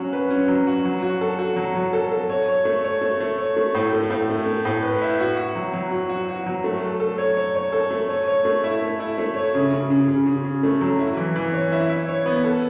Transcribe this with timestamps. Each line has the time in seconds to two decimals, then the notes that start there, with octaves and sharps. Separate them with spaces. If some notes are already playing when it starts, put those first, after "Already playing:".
Already playing: F#3 C#4 F#4
0.13 B4
0.30 C#4
0.48 F#3
0.67 F#4
0.85 F#3
1.03 F#4
1.21 A4
1.39 F#4
1.57 F#3
1.75 F#3
1.93 A4
2.12 A4
2.30 C#5
2.48 C#5
2.65 A3
2.85 C#5
3.01 A3
3.20 A3
3.38 C#5
3.57 A3
3.75 A2
3.93 A3
4.10 A2
4.29 A3
4.46 A3
4.65 A2
4.83 B4
5.02 E4
5.20 F#4
5.37 F#4
5.55 F#3
5.74 F#3
5.91 F#4
6.09 F#4
6.29 F#4
6.46 F#3
6.64 A3
6.82 A4
7.00 A4
7.18 C#5
7.37 C#5
7.55 C#5
7.72 A4
7.91 A3
8.09 C#5
8.28 C#5
8.45 A3
8.64 E4
8.82 A3
9.00 E4
9.18 A3
9.36 C#5
9.55 C#3
9.73 C#3
9.90 C#3
10.08 C#3
10.26 C#3
10.45 C#3
10.63 A3
10.81 F#3
10.99 E4
11.17 E3
11.36 E3
11.54 C#5
11.72 E4
11.90 E4
12.08 C#5
12.26 B3
12.44 A4